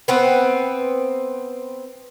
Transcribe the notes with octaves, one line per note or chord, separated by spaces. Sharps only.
B3 C4 B4